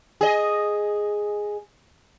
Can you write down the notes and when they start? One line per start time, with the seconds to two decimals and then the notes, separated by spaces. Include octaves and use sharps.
0.21 G#4 D#5